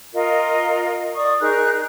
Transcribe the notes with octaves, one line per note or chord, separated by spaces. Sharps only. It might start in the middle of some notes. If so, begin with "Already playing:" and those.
F4 A#4 D#5
D5 C#6 D#6
D#4 G#4 A#4 F#6